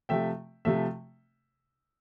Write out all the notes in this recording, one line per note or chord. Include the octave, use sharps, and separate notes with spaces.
C3 F3 A3 E5 G5
C3 F3 A3 E5